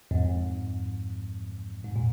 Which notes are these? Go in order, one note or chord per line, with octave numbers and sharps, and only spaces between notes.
F2 G#2
G#2
A#2